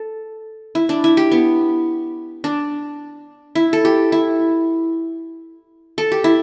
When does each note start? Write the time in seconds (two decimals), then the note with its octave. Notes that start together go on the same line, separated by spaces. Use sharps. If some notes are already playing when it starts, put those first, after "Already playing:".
Already playing: A4
0.75 E4
0.89 D4
1.04 E4
1.17 G4
1.31 B3
2.44 D4
3.55 E4
3.73 A4
3.85 G4
4.12 E4
5.98 A4
6.12 G4
6.24 E4